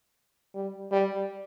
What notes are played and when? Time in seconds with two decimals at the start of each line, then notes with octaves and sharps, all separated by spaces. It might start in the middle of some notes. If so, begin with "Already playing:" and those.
0.55 G3
0.92 G3